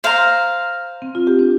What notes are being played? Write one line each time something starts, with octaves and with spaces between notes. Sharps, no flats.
C5 F5 A#5
C4
F4
G4
D4